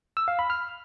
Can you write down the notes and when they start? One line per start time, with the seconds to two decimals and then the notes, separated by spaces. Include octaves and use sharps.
0.17 E6
0.28 F5
0.39 B5
0.50 F6